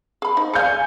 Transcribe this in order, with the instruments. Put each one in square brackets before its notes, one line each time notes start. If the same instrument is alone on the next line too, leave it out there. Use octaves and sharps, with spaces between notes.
[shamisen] G#4 B5
D#4 C5
[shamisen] G#4 D5 F5 [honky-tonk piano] G#5 G6 C#7